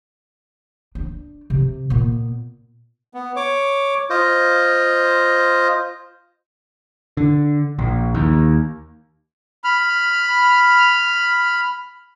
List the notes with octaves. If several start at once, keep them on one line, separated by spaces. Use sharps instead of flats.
D4
C3
A#2 B3
B3
C#5 D6
F4 C5 D#5
D3
A#1
D#2
B5 F6